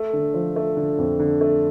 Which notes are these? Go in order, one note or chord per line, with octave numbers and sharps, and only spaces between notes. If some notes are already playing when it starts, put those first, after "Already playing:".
Already playing: A3
D3
F3
A3
D3
F2
D3
A3